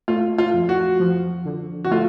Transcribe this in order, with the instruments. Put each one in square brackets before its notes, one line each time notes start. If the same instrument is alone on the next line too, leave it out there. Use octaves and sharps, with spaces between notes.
[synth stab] A3 [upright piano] F4
[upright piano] F4
[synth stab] F2
[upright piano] F#4
[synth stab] F3
D3
[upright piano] F#4
[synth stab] A3 [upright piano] F4